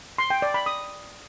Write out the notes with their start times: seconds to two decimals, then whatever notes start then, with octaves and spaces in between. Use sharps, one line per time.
0.18 C6
0.30 G5
0.42 D5
0.54 B5
0.66 D#6